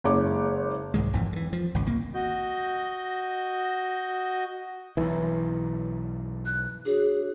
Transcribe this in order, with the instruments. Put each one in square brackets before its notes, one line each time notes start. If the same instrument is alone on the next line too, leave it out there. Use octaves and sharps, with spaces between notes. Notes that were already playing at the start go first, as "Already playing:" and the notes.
[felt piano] F#1 G#3 C#5 D6
[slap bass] C2 G#2 D#3 G#3
G#1 F2 G#2 E3
D3 E3
F3
G#1 C#2
C2 A#3
[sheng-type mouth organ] F#4 D#5 G6
[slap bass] B1 G2 [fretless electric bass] E3
[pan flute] F#6
[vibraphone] D4 F#4 C#5 [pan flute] G#4